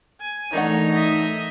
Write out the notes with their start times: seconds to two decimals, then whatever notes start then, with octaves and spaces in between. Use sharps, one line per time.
0.21 G#5
0.53 D#3 E3 A3 D4 D#4 C#5 F#5
0.92 D#5 E5